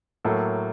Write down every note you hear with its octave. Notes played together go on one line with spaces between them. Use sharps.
A2 F#3 A#3 A4